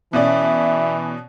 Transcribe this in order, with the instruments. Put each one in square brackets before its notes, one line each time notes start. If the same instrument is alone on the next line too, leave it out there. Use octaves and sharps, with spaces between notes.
[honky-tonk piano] B2 C#4 D5 [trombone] E3 [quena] E5